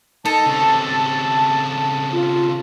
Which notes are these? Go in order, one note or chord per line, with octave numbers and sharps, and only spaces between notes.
D#4 A4 A5
C#3 C4
F4